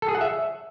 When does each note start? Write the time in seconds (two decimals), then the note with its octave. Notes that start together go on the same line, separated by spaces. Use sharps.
0.02 A4
0.09 G#4
0.15 F#5
0.21 E5